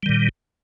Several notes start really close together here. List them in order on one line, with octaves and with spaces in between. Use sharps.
G3 D#3 A#2